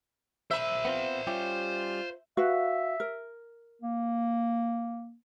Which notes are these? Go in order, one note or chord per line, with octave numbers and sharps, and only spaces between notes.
C5 E5 B5
B3 C4 F4
G3 C#4 F4 G4
F#4 B4 E5 F5
A#4
A#3